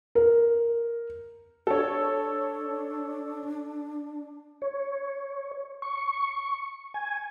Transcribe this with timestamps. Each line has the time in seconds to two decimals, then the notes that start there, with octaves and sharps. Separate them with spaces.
0.15 A#4
1.67 D4 A4 C#5
4.62 C#5
5.82 C#6
6.94 G#5